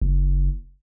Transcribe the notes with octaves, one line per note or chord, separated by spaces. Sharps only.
F#1